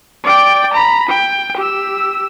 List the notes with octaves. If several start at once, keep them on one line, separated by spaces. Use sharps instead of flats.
D5 G5
A#5 B5
G5
G4 E6